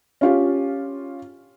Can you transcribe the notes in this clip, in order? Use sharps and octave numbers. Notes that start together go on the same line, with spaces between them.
C#4 F4 G4